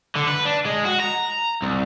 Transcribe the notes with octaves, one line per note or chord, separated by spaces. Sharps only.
D3
B4
D4
G#3
F#4
A#5
C2